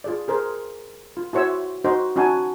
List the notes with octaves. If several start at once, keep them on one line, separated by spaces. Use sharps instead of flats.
F4 G#4 D5
G#4 A#4 C5
F4
E4 F#4 C5 C#5 E5 E6
D#4 F#4 C5 D#5
C#4 D#4 F#4 G#5 A5